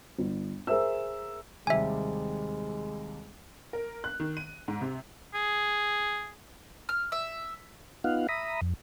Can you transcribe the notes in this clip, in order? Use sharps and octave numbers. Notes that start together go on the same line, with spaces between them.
G1
G#4 A#4 C5 E5 E6
D#2 C3 G3 G#3 E5 G#5
A#4
F#6
D#3
D#7
G#2
C3
G#4
F6
E5
B3 D#4 F4 F5 F#5
E5 A#5 B5 D#6
F2